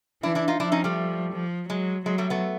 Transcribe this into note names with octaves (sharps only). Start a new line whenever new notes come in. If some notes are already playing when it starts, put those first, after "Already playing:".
E3 D4 E4
D4 E4
D#4 F4
F3 D4 E4
C#4 D#4
G3 A3
F3
F#3 G#3
F#3 G#3
G3 A3
A3 B3